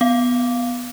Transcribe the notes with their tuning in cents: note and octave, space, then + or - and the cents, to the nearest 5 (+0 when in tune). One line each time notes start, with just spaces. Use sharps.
B3 +0 F5 +0